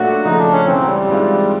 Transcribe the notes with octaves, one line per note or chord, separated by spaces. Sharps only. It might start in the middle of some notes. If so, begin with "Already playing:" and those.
Already playing: A#2 F#3 A3 D4 F#4
C#3 F3 A3 D#4
D4
C#4
C#2 C#3 E3 C4
F#3
G3
G#2 E3 G#3 C4 F4